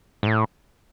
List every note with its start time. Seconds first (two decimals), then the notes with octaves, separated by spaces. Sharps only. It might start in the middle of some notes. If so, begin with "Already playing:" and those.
0.23 G#2
0.27 A2